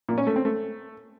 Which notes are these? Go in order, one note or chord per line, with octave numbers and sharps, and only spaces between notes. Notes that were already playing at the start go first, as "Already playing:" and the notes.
A#2
C#4
A3
C4
A3